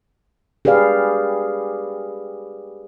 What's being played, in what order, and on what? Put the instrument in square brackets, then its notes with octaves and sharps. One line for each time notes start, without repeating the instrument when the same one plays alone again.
[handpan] G4 G#4 B4 D5 F5